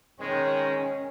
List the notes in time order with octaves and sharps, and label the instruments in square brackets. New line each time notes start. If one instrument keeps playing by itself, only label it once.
[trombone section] D#3 G#3 [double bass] C#4